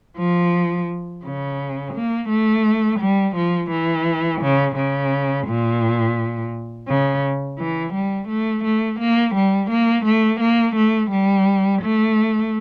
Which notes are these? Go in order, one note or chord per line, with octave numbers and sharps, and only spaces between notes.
F3
C#3
A#3
A3
G3
F3
E3
C#3
C#3
A#2
C#3
E3
G3
A3
A3
A#3
G3
A#3
A3
A#3
A3
G3
A3